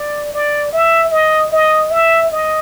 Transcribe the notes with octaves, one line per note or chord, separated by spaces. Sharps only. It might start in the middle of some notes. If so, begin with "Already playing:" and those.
Already playing: D5
D5
E5
D#5
D#5
E5
D#5